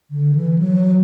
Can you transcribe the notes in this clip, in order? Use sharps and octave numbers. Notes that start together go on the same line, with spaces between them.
D3
E3
F#3